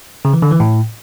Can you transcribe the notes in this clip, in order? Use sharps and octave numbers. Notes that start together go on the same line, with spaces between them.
C#3
E3
D3
E3
A2